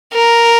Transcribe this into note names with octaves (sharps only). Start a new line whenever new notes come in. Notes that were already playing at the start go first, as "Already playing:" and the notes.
A#4